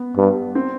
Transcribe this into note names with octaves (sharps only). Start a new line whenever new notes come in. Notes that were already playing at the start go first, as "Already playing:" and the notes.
Already playing: B3
G2
C4